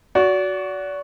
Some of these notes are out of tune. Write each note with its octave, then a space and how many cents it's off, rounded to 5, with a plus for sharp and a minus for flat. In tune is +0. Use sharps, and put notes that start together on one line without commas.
F#4 +0 D5 -35